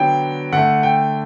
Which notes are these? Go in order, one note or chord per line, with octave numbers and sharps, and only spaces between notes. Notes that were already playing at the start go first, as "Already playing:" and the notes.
Already playing: D3 F#3 B3 G5
D3 A3 F#5
G5